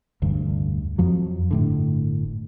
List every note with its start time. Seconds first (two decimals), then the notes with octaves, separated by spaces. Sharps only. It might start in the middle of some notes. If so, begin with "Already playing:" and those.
0.22 F1 D2 G2
0.98 F2 F3 F#3
1.51 G1 A2 D3